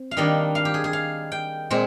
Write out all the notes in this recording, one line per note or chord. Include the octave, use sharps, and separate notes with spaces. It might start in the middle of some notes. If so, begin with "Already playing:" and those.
Already playing: C4
F5
D#3 G3 A#3 D4 D#5
F5
G4
G#4
G#4
F5
G5
A#2 G#3 C4